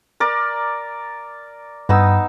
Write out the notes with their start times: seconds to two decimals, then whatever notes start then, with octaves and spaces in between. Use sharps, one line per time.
0.20 A#4 D5
1.89 G2 B3 D#4 E6